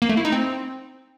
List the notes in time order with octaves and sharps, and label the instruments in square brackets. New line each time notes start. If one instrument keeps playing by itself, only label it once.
[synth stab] A#3
A3
E4
D#4
C4